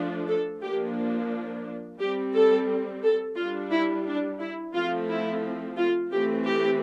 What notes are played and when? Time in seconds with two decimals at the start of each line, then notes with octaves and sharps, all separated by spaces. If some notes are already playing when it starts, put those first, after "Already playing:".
Already playing: F3 A3 D4
0.28 A4
0.62 F3 A#3 D4 G4
1.99 G3 C4 G4
2.34 A4
3.03 A4
3.37 G3 D4 F4
3.71 E4
4.05 D4
4.39 E4
4.74 F3 A3 C4 F4
5.08 E4
5.78 F4
6.11 E3 A3 C4 G4
6.46 G4